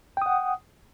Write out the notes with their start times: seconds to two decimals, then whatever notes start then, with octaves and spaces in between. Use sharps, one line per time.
0.17 G5
0.22 D#6
0.26 F#5